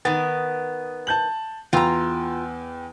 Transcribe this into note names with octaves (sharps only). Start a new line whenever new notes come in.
D#3 B3 A6
A5 G6 F#7
E2 F4 G5 A#5 E6